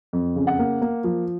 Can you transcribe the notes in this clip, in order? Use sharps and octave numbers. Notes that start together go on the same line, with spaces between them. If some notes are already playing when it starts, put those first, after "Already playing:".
F2
C#3
F#5
A#3
A#3
F3